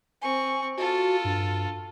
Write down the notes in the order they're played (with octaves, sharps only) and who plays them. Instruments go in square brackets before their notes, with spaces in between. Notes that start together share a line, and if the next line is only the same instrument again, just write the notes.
[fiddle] C4 C#6 [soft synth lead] G#5
[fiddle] F4 A4 [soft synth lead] F#4
[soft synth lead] G2